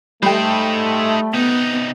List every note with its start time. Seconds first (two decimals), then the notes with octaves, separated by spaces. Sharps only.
0.23 G3 A3 D#4 C5 G5
1.33 C3 B3 D#4